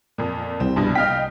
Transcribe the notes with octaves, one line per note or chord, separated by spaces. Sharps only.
F2 A#2
C2 C4
A#1 G2 B2
D#5 F5 G5 F6 B6